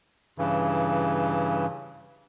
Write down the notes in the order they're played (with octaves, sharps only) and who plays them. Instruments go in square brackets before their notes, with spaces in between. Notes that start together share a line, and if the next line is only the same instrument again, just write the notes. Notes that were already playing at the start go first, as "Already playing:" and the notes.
[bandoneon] G2 C#3 E3